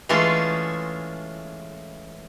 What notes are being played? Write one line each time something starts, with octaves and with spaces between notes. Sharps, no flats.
E3 G#3 A3 C#4 F4 G#4